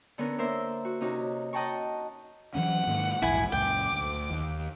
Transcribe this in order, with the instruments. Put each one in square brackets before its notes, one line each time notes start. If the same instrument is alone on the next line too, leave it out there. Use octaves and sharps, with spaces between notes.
[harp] D3 B3 C#4 A#4
A#3 D4 A#4 C5 E5
F#4
C3 C#4 D#4 F#4
D#5 F#5 G5 A5 A#5 C#6
[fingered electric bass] E3 F#3 C#4 [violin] F#5
[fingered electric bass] G#2 D#3 A#3
[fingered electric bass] A#1 E2 G#2 [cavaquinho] E4 G#5
[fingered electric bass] C#2 F#2 A#2 [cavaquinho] G5 [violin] D6
[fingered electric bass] D2
D#2